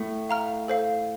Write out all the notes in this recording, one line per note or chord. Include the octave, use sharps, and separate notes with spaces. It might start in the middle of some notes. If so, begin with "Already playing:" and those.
Already playing: A2 A3
F5 A#5 F6
A4 C5 F5